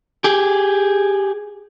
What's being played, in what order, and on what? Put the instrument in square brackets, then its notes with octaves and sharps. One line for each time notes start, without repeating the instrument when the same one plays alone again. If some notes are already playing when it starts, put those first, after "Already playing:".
[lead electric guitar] G4 G#4